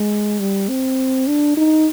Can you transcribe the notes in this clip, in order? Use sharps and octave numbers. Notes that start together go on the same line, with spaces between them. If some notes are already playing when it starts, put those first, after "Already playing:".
Already playing: G#3
G3
C4
D4
D#4